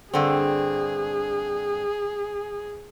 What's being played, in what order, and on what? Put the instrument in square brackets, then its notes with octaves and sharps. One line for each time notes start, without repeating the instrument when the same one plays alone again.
[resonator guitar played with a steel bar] G2 D3 C4 [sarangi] G#4